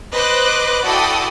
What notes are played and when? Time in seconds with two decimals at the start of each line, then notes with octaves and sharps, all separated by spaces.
0.12 B4 C5 D#5 D6 F#6
0.83 E4 F#4 A4 D5 G5 D#6